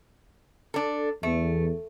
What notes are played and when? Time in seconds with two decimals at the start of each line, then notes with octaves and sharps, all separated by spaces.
0.74 D4 A4
1.23 E2 A3